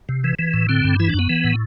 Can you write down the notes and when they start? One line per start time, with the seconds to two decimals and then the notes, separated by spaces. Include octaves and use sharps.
0.09 C3
0.24 E3
0.39 E3
0.54 A2
0.69 D3 C4
0.84 G2
0.99 E3 E4
1.09 D4
1.14 F#2
1.19 B3
1.29 E3
1.44 A2